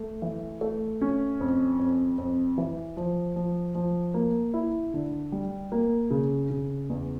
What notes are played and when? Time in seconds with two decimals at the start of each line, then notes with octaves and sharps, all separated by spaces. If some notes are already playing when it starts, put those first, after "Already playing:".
Already playing: A3
0.22 E3
0.61 A3
1.01 C#4
1.41 F2
1.79 F2
2.18 F2
2.58 E3
2.97 F3
3.36 F3
3.75 F3
4.14 A#3
4.54 E4
4.94 D3
5.32 G3
5.72 A#3
6.11 C#3
6.50 C#3
6.90 E2